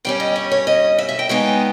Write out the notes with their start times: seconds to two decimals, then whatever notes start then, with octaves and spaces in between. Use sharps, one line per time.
0.05 G2 G3 C#4 G5
0.20 D#5
0.36 C#5
0.51 C#5
0.67 D#5
0.98 E5
1.09 E5
1.19 G5
1.29 C#3 G#3 B3 D#4 G5